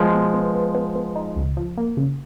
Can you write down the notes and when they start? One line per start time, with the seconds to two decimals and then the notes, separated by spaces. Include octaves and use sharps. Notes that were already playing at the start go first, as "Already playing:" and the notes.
Already playing: F3 G#3 B3
0.13 B2
0.34 B3
0.54 B3
0.75 B3
0.95 B3
1.16 D#4
1.36 C#2
1.57 F3
1.77 A#3
1.97 C#3